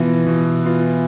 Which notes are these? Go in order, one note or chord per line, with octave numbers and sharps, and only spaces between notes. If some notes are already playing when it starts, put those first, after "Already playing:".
Already playing: B2 E3 B3 F4
B2
B3 F4